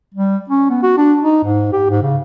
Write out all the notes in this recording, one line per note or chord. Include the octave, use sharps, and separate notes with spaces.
G3
C#4
B3
F#4
D4
D#4
G#2
G4
G#2
C#3